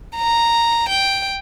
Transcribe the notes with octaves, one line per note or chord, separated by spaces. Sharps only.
A#5
G5